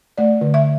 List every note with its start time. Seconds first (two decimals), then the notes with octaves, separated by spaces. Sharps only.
0.18 A3 D5
0.41 D3
0.54 E5